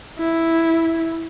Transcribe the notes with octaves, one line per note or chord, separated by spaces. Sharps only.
E4